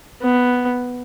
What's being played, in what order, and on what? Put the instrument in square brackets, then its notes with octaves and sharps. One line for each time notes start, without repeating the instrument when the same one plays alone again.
[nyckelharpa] B3